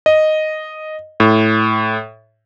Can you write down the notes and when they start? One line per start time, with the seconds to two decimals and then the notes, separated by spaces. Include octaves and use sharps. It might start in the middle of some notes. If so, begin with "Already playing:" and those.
0.06 D#5
1.20 A2